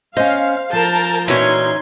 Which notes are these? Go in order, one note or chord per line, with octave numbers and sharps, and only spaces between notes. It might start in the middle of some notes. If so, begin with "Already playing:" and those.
C#4 C5 D#5 F5
F3 A#4 A5 A#5 G6
A#2 E3 C#4 D#4 F#4 C6 G#6